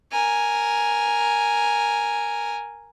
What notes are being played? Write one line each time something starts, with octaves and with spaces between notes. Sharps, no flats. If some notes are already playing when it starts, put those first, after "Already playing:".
A#4 G#5